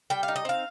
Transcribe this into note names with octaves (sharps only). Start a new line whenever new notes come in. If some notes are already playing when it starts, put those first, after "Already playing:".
G3 G5
F5
D#4
D#5
C4 F5